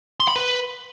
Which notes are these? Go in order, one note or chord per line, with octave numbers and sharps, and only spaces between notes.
C6
B5
B4